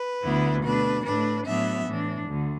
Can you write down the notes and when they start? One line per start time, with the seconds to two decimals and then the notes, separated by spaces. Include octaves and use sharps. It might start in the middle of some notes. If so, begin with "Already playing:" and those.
Already playing: B4
0.23 D2 D3 B3 E4
0.63 B2 A3 D4 B4
1.04 A2 A3 D4 B4
1.46 A2 F#3 B3 D4 E5
1.86 A2 E3 D4
2.27 D2 D3